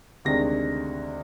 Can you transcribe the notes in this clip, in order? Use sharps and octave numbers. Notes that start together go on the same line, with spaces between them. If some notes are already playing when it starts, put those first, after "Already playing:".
D2 C3 D#3 G#3 D4 A#6